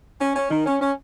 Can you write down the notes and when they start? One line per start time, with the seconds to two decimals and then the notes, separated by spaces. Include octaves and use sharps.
0.21 C#4
0.36 C#4
0.50 D#3
0.66 C#4
0.81 C#4